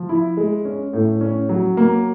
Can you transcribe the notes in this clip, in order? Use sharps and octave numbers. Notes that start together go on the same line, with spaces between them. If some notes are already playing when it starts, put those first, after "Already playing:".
Already playing: F3
E4
G#3
C#4
A2
C#4
F#3
A#3